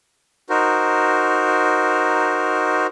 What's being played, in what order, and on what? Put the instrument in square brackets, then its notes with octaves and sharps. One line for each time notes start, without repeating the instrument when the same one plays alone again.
[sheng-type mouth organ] D#4 F#4 A#4 C5